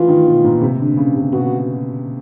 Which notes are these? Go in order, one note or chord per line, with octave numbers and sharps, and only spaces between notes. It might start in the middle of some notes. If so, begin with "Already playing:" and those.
Already playing: E3 F3 F4
D#3
B2
A#2
C3
D3
C#3
C3
B2 F#4